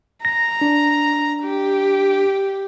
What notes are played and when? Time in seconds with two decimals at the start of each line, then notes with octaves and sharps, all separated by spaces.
0.25 A#5 A#6
0.61 D4
1.43 G4